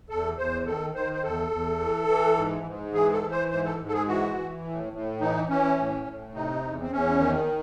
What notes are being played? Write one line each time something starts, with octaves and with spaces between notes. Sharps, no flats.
E2 A4
E2 C5
D#3 A4
D#3 C5
C5
E2 A4
E2
E3
E3
G#2
G#2
E3 G#4
A4
E3
C5
G#2 C5
A4
G#2
A4
G#4
E3 F#4
E3
A2
A2
E3 D#4
E3 C#4
A2
A2
C3 D#4
E2
C4
E2 C#4
D#3